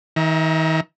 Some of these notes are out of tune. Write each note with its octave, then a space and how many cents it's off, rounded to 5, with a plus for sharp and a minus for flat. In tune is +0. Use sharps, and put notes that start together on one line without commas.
D#3 +40 E5 +0 A#5 +20